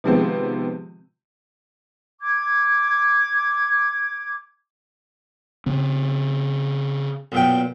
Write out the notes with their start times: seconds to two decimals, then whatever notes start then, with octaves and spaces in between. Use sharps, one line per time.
0.04 C3 D#3 F3 G#3 B3 C4
2.21 D6 G#6
5.66 C#3 C4
7.32 B1 A#2 G5